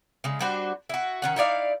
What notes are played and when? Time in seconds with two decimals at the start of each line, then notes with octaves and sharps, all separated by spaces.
0.24 C#3 G#3
0.40 G3 D4 F#4 C5
0.89 E4 F#4
1.22 D#3 C#4 F#5
1.36 D#4 E4 D5 F5